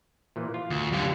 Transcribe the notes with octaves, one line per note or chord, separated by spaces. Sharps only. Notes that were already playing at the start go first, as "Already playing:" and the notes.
A#2 E3 F3
F4
D2
F#2 D3 F4 G4